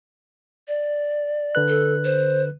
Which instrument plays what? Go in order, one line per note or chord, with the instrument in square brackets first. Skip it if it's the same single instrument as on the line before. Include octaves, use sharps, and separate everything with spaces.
[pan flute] D5
[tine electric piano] D3 B4 F#6
[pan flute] A4
C5